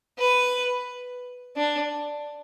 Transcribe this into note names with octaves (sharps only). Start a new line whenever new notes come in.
B4
D4